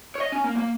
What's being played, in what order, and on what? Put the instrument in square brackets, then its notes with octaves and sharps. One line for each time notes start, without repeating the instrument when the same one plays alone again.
[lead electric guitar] C#5
D#5
C#4
A#3
A#3